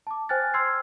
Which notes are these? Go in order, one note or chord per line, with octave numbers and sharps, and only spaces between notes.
A5 D6
C5 G5 G#5 F6 F#6 A6
C6 E6 F6 G#6 C7